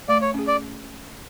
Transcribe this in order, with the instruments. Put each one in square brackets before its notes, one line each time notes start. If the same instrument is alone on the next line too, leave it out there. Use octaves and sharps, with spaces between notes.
[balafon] A3 [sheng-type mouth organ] D5
[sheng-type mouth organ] C#5
[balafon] C#4 G#4
[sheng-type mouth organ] D5